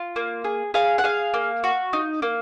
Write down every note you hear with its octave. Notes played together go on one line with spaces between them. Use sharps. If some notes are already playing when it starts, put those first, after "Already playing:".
Already playing: F4
A#3
G#4
G#4 F5
F#5
G#4 F5
A#3
F#4
D#4
A#3